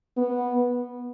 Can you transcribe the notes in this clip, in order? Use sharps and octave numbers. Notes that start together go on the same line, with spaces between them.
B3